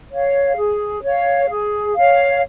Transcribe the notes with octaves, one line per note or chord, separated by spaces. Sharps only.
C#5 F5
G#4
C#5 F5
G#4
C#5 F5